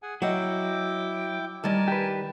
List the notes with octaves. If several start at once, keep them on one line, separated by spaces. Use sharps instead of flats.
G#4 F#5 G#5
F#3 E4 D#5 F#5 G5 D6
D#3 G3 A#4 G#5 A5
G4 B4